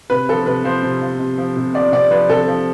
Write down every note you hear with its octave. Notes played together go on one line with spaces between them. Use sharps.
C3 B4
F3 A4
C3 B4
F3 C5
C3
F3
C3
F3
C3
F3 D5
C3 D5
F3 B4
C3 A4
F3